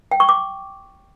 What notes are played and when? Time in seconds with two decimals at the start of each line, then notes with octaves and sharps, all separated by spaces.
0.12 G5
0.20 C#6
0.29 D6